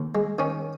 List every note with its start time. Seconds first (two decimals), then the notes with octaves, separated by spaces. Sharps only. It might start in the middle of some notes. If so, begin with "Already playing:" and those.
Already playing: D#2
0.15 G#3
0.39 D#3 C#4